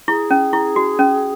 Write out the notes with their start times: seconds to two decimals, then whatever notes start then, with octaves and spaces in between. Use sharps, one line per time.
0.08 E4 G#4
0.31 C#4
0.53 E4
0.76 F#4
0.99 C#4